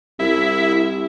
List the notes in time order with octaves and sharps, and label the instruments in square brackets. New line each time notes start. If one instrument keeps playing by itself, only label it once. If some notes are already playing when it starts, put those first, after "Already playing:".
[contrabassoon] C2 [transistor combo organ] E4